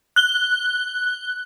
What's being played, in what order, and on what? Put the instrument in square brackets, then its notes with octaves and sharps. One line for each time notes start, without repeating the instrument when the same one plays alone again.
[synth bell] F#6 G7